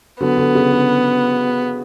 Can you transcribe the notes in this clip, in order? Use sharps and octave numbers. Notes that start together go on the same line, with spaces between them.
D3 F#3 B3
D3
C#3
D3